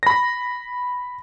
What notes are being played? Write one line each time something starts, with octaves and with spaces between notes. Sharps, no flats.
B5 A#6